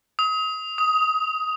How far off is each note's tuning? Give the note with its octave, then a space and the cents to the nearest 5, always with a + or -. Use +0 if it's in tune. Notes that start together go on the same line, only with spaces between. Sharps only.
D#6 +35
D#6 +15